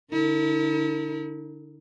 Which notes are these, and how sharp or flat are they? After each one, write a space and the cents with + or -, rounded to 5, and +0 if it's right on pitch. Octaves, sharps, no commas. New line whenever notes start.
D3 +0 E4 -40 A#4 -35